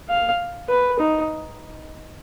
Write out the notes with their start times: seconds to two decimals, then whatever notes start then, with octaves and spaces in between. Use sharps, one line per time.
0.10 F5
0.70 B4
1.00 D#4